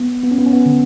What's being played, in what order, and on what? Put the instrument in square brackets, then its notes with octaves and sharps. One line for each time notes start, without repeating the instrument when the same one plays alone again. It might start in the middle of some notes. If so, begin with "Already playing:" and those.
Already playing: [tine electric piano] B3
B3
C#4
B3
C#4
B3
D3